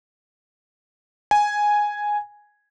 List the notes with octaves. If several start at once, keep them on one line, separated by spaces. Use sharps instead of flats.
G#5